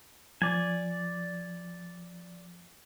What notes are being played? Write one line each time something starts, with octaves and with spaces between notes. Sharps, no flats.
F3 D5 G#5